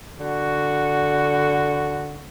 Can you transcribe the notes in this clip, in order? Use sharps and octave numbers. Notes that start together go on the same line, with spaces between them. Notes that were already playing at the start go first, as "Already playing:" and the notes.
D3 F#4